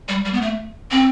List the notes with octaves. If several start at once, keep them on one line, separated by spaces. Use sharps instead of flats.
G3
G3
B3
A3
C4